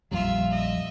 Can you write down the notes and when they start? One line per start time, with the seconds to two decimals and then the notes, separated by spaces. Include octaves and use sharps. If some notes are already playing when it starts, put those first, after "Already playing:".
0.11 A#1 F2 G3 F4 E5
0.52 D#5 E5